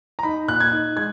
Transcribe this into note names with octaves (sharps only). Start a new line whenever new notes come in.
A#5
D#4 B5
A#2 F#6
G#6
D#4
G#3 G#6